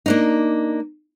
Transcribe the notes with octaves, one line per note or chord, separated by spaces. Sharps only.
A#3 D4 D#4